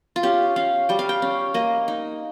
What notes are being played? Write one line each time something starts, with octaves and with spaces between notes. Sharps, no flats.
F4
C#4 G4
C#4 F5
G3 G5
F5
G5
C#4
A#3 D#5
D#4